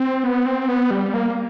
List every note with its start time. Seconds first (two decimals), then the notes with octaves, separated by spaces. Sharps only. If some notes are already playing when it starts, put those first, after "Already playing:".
Already playing: C4
0.24 B3
0.46 C4
0.69 B3
0.91 G3
1.14 A#3